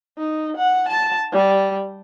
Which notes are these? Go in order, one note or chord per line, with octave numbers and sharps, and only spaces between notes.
D#4
F#5
A5
G3